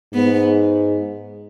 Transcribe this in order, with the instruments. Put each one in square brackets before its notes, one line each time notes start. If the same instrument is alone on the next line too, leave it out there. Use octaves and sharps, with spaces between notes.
[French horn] G#2 [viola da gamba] B3